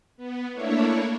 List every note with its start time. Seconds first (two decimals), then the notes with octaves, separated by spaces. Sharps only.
0.17 B3
0.54 A3 A#3 D4 E4 C#5